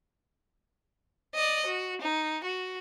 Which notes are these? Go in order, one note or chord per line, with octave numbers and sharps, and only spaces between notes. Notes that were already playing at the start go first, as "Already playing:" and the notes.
D5 D#5
F#4
D#4
F#4